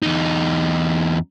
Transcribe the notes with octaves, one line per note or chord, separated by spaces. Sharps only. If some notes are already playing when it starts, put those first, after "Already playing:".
E2 D#4